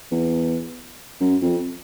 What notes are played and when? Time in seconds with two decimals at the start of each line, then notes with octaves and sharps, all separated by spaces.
0.11 E2
1.20 F#2
1.42 F2